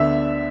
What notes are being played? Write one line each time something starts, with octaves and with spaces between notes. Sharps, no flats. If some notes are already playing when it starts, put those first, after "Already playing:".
Already playing: D2 D3 B3 D4 E5